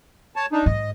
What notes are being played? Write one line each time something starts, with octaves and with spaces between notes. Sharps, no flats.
C#5 A5
D4 D#4
G#2 D#5